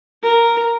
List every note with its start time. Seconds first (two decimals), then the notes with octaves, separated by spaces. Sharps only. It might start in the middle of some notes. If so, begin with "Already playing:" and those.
0.23 A#4